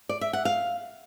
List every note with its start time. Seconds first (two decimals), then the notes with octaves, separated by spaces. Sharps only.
0.09 D5
0.21 E5
0.33 F#5
0.45 F5